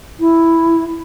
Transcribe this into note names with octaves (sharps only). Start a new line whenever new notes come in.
E4